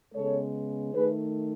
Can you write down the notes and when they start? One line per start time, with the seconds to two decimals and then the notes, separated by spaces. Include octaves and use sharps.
0.14 C#3 G#3 B3 A4 C#5
0.94 D#3 A3 G#4 B4